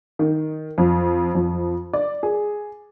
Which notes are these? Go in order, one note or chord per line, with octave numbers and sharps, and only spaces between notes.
D#3
F2
F2
D5
G#4